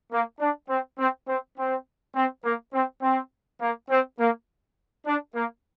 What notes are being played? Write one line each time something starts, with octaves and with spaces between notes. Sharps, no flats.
A#3
D4
C4
C4
C4
C4
C4
A#3
C4
C4
A#3
C4
A#3
D4
A#3